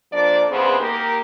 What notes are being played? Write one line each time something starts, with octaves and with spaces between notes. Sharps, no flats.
F3 A#3 D4 A4 D5
E2 G2 C#3 B3 C4 C5
A#3 D#4 G4 A#4